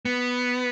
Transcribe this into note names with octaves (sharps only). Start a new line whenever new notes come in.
B3